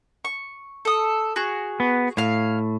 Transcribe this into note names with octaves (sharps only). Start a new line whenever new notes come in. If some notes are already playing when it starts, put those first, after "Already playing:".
C#6
A4 D#6
F#4 G#4
B3
A2 C#5 F5